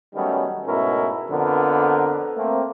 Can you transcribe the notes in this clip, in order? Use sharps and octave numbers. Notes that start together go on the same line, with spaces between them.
D#3 F#3 G3 A3 B3 C#4
G#2 B2 A3 C#4 E4 A#4
F2 D3 F3 B3 A#4 B4
A3 A#3 C4